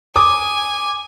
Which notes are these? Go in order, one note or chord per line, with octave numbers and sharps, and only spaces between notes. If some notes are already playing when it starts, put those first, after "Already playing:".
G#5 D6 D#6